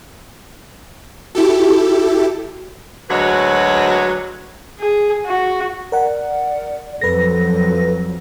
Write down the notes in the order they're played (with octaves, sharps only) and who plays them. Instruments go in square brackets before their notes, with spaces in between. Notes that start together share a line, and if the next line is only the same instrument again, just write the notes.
[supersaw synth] E4 G4 A4 [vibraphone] F#4
[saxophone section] D2 F#3 G#3 F#4 B4 C#5
[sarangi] G#4
F#4
[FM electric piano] A#4 F#5 [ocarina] D5
[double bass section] F2 F#3 [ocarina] A4 [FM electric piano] B4 A#6